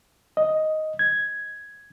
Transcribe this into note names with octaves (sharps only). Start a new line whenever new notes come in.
D#5
G#6